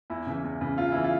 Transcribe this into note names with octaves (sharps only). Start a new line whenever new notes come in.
E2 E4
C#3 E3
E2
C#3 E3
E2 F4
C#3 E3 E4
F4